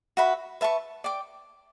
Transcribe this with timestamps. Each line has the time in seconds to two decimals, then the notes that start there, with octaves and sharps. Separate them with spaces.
0.17 F#4 B4 E5 B5
0.61 B4 E5 A5 C#6
1.04 D5 G5 D6